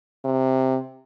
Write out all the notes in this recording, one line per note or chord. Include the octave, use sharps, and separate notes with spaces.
C3